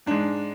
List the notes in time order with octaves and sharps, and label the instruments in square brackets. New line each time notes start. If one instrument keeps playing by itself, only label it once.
[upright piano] G#2 G#3 D4